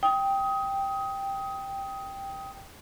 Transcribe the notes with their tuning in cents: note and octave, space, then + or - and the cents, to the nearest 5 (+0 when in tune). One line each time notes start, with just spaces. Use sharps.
G5 +0 D#6 +20